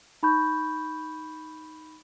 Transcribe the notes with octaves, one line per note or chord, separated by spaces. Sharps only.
D#4 B5 C#6 G6